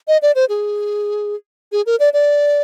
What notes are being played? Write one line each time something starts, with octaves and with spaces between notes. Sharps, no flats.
D#5
D5
C5
G#4
G#4
A#4
D5
D5